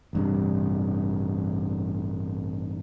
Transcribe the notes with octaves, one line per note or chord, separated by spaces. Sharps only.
A1 G2 C3